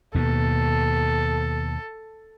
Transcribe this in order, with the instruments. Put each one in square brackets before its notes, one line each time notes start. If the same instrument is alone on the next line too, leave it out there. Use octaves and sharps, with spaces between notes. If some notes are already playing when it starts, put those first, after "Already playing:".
[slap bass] D#2 B2 [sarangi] A4